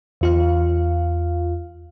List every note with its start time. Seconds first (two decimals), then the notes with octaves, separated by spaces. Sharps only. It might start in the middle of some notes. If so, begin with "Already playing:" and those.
0.21 E2 F4 F5